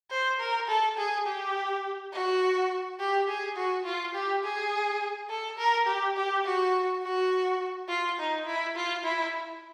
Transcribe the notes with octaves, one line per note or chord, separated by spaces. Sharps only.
C5
A#4
A4
G#4
G4
F#4
G4
G#4
F#4
F4
G4
G#4
A4
A#4
G4
G4
F#4
F#4
F4
D#4
E4
F4
E4